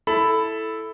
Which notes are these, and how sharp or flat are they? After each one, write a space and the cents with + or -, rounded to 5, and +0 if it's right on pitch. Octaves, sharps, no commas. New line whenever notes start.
E4 +0 A4 -5 B5 +10